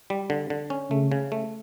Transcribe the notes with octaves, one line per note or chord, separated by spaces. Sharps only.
G3
D3
D3
C#4
C#3 A3
C#3
A3